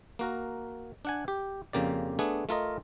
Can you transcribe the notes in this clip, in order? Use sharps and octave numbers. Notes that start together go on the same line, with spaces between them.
A#3 F#4 A#4
D4 F#5 G#5
G4
F2 C#3 A#3 G4 D5
A3 B3 D4 G#4
A3 F4 A#4 D#5